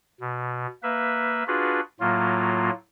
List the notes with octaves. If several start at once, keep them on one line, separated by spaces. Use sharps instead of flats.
B2
A#3 B4 E5
D4 F4 F#4 G#4 B4
A2 F#3 A#3 F4